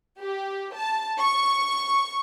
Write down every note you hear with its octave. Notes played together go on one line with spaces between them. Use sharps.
G4
A5
C#6